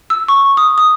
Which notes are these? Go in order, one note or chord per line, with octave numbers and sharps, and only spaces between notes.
E6
C#6
D#6
D#6